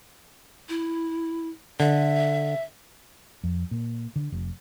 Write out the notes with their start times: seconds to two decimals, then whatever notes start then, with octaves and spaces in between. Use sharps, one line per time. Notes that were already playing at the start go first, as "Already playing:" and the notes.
0.69 E4
1.80 D3 E5
3.44 F2
3.71 A#2
4.16 D3
4.32 F1